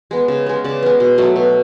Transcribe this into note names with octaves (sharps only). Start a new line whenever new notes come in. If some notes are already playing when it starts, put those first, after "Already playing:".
G#3 B3
C#3
G#3 B3
C#3 D5
G#3 B3
B2
F#3 A3
B2